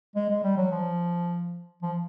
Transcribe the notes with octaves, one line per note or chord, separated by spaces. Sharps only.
G#3
G#3
G3
F#3
F3
F3